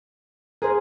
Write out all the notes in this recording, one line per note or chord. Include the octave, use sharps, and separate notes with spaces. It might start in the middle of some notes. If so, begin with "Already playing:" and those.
G#4 A#4 C5